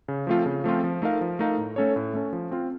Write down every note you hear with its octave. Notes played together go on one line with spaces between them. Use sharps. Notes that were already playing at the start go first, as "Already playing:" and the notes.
C#3
F3 A3 C4 F4
C#3
F3 A3 C4 F4
F3
A3 D#4 A#4 F5
F3
A3 D#4 A#4 F5
A2
A3 C#4 A4 C#5
A2
A3 C#4 A4 C#5
F3
C4 F4